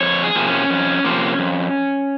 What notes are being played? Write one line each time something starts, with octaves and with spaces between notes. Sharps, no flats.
F2 C#5
G#4
C3 F3 A#3
C#4
F2
C3 F3 A#3
F2